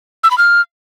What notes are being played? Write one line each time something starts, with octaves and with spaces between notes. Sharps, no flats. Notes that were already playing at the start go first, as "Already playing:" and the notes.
E6
B5
F6